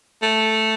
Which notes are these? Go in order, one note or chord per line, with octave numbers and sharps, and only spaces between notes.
A3